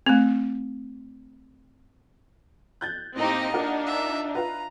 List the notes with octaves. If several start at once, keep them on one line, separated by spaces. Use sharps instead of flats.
A3 C4
F#6 G6 A6
A2 A#3 C4 D#4 G4 D#5
D4 D#4 F4 A#4 F#5
E5
F4 B4 A#5